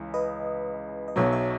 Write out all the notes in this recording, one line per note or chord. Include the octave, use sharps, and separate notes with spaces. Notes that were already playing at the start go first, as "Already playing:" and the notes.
Already playing: C#2 C#3 E3
B4 D#5
D#5
B1 B2 F#3 C#5 E5
C#5 E5